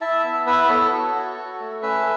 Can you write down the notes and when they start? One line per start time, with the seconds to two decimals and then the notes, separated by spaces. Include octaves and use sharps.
0.01 E4 E5 A5
0.24 B3
0.47 E4 B4 E5
0.69 B3 A4 C#5
0.92 F#4
1.15 F#4
1.37 F#4
1.60 A3
1.82 C#4 B4 E5